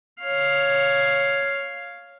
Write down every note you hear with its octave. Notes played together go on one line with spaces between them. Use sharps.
C#5 F5